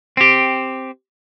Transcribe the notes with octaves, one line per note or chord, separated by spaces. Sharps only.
C4 G4